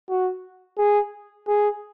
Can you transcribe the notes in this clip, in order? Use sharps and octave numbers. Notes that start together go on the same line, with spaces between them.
F#4
G#4
G#4